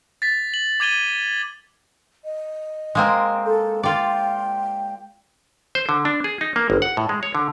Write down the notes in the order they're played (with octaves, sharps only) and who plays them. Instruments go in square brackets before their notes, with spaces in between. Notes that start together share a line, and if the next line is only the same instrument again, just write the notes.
[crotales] A6 B6
F#7
D6 G#6 D#7 G7
[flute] D#5
[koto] G#3 A#3 C4
[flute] A4
[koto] F4 D5 [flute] G5
[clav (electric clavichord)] C5
D3
D4
G#4
D#4
A#3
G1
F#5
A2
G#3
C#5
D3